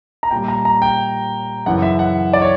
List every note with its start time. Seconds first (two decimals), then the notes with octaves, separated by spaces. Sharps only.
0.23 A#5
0.31 A#2 G3 G5
0.48 A#5
0.65 A#5
0.82 G5
1.66 F#2 C#3 E3 F#5
1.82 E5
1.99 F#5
2.33 D5
2.42 C#5